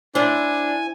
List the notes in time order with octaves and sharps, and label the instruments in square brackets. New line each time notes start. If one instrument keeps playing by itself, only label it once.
[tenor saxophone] D4 [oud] E4 C5 [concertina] G#5